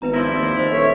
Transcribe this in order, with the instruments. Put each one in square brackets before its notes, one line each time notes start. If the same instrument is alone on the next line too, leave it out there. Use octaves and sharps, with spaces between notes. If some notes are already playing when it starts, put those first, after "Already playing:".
[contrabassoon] G#1 [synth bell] B3 B4 A#5
[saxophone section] F3 G3 E4 [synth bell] A#6
[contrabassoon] D#2
[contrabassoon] D#3 [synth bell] C5
[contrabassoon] D#1 [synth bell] A4 B4 [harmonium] C#5 E5